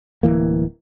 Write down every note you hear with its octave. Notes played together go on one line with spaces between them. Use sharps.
D1 D#2 E3 A#3